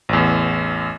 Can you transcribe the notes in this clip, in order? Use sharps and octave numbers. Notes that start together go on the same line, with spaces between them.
A1 E2